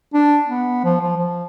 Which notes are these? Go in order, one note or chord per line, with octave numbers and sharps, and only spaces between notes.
D4
B3
F3
F3
F3